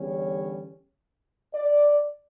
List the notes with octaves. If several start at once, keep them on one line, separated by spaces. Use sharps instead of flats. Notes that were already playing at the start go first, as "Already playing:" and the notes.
Already playing: E2 D3 G3 C#4 C#5
D5